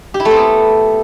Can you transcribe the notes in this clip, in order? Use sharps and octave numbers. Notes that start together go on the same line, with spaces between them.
G4
E4
A3
C4
B3